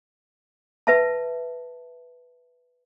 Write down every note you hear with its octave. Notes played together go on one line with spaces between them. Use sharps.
B4 E5 A5